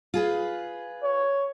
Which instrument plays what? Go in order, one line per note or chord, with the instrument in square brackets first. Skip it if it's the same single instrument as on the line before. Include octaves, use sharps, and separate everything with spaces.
[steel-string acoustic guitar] F4 G#4 B4
[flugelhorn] C#5